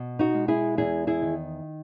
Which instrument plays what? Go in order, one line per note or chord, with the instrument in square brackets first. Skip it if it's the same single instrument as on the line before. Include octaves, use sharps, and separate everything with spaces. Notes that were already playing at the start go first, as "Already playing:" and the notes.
Already playing: [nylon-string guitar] B2
D#4 F#4
G#3
E4 G#4
E2 E4 G#4
E4 G#4
D#3